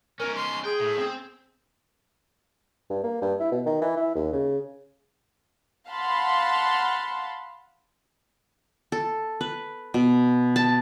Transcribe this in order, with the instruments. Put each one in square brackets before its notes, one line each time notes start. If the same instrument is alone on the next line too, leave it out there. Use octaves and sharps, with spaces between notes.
[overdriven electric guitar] C#4 D#4 [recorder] A#4
[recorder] C6
[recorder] G#4 [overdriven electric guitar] G5
[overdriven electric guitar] A2
C4
[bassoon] G2
A#3
G2
E4
B2
D#3
E3
E4
D#2
C#3
[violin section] F5 F#5 A5 B5 C6
[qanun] A4
B4
B2
A5